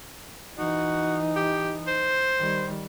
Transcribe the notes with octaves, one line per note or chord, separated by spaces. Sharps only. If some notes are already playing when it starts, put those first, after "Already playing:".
E3 D#4 F#4
G4
C5
D#3 G3